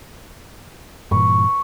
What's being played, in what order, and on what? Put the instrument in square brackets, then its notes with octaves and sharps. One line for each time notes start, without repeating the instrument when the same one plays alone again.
[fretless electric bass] G2 A#2 E3 [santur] B4 C#6